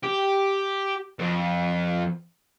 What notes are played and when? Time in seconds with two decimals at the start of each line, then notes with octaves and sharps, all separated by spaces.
0.03 G4
1.19 F2